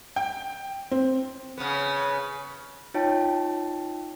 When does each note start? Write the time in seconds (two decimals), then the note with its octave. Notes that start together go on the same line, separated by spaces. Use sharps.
0.16 G5
0.91 C4
1.58 C#3 B3
2.94 D#4 F4 C#5 G5 A5